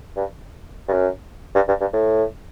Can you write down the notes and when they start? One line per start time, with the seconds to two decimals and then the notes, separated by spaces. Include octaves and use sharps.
0.16 G2
0.88 G2
0.93 F#2
1.55 G2
1.68 G2
1.81 G2
1.93 A2